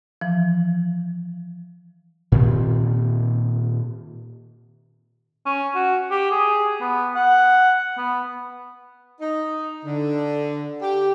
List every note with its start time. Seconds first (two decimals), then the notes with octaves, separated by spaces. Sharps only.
0.21 E3 F3
2.32 A#2 D#3 C4
5.46 C#4
5.75 F#4
6.11 G4
6.31 G#4
6.81 B3
7.16 F#5
7.98 B3
9.20 D#4
9.85 D3
10.81 G4